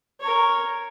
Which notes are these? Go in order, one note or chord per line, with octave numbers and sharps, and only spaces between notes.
A#4 C#5